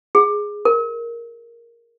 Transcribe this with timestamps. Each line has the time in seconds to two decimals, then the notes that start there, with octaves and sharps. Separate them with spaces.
0.15 G#4
0.65 A#4